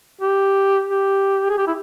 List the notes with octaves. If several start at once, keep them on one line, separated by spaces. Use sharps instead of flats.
G4
G4
G#4
G4
E4